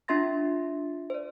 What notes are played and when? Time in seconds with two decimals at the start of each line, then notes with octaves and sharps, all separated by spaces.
0.08 D4 F4 E5 C6 A6 A#6
1.10 C5 D5